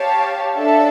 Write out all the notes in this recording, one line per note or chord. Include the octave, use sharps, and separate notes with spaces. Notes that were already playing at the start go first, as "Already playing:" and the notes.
Already playing: G4 C#5 F5 A5
D4 A4 E5 A5